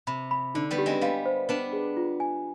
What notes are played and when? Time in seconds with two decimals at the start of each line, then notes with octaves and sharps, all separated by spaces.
0.07 C3 B5
0.31 B5
0.55 D3 D#4
0.71 G3 B3
0.78 G4
0.86 G#3 C4
1.01 G3 B3 F5
1.26 C5
1.49 B3 D4 B4
1.73 G#4
1.97 F4
2.20 G#5